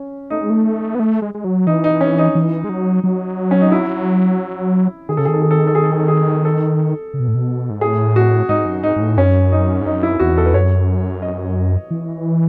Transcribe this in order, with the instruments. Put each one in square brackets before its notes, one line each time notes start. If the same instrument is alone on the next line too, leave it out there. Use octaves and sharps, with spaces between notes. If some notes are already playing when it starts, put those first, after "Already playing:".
Already playing: [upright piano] C#4
[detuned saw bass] A3 [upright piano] D#4
[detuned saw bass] G#3
A3
B3
A3
G#3
G#3
F#3
[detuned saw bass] E3 [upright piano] D#4
[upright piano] D#4
C#4
D#4
[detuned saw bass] E3
G#3
F#3
F#3
[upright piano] C#4
D#4
E4
[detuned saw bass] D#3 [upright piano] G#4
[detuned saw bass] C#3 [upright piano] A4
[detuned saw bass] D#3 [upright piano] G#4
[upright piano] A4
G#4
A4
G#4
A4
G#4
A4
G#4
A4
G#4
A4
[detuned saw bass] C#3
B2
A2
B2
G#2
[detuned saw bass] A2 [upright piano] G#4
[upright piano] F#4
[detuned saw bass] G#2 [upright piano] D#4
[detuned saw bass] F#2
[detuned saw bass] G#2 [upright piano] D#4
[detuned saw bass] G#2
A2
[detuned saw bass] F#2 [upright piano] C#4
[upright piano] D#4
[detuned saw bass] G#2
[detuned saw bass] F#2 [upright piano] D#4
[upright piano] E4
[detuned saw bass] E2 [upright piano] F#4
[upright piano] A4
B4
[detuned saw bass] F#2 [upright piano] C#5
[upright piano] D#5
[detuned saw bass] E3